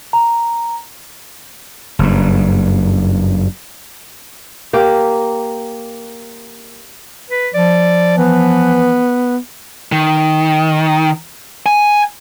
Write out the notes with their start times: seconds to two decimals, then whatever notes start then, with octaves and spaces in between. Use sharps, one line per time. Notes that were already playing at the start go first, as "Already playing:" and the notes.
0.13 A#5
1.99 F#1 G2
4.73 A#3 G4
7.30 B4
7.54 F3 D5
8.17 E3 B3
9.92 D#3
11.66 G#5